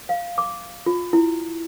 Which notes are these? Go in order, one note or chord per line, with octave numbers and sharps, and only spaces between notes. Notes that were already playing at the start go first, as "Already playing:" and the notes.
F5
D6
F4
E4